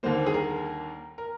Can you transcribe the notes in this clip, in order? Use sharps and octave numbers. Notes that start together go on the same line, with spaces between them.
D#2 D3 G3 A#3 C5
G#4
A#4
A#4